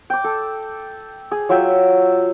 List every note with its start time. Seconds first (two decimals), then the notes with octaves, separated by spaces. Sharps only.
0.10 G5 D6
0.24 A4
1.32 G#4
1.49 F#3 F4 E5 G5